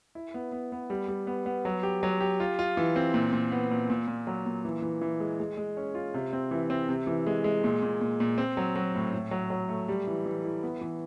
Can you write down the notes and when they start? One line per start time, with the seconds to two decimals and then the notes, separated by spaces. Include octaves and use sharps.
0.15 E4
0.34 B3
0.52 B3
0.72 B3
0.90 G3
1.08 G3
1.27 B3
1.46 B3
1.65 F#3
1.83 G4
2.03 F#3
2.20 G4
2.40 F4
2.59 F4
2.77 E3
2.96 C4
3.14 A#2
3.33 A#2
3.52 B3
3.71 A#2
3.90 A#2
4.08 A#2
4.27 F#3
4.46 A#2
4.65 E3
4.82 E3
5.01 E3
5.20 G#3
5.40 G#3
5.57 G#3
5.77 C#4
5.95 F4
6.14 C3
6.33 C4
6.51 E3
6.70 C4
6.89 C3
7.07 E3
7.27 G#3
7.44 G#3
7.64 A#2
7.83 A#2
8.01 A#2
8.20 A#2
8.38 C4
8.57 F#3
8.76 F#3
8.95 A2
9.13 A2
9.31 F#3
9.50 F#3
9.69 A3
9.88 G3
10.07 E3
10.26 E3
10.45 E4
10.63 B3
10.81 E3